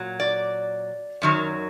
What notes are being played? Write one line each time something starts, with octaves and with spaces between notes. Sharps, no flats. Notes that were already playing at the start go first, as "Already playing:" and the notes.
Already playing: A#2 F#3
D5
F#2 D#3 F#3